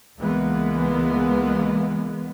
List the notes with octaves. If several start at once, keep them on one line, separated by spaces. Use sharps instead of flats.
C#2 E3 G#3 A#3 B3